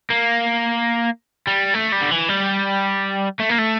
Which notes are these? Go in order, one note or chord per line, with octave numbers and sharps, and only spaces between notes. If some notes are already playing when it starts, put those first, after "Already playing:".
A#3
G3
A3
G3
D3
E3
G3
A3
A#3
A3